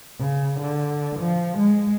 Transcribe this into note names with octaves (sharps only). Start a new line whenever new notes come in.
C#3
D3
F3
G#3